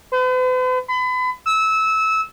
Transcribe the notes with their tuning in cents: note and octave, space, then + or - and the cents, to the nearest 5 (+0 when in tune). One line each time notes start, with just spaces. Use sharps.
B4 +45
B5 +35
E6 -20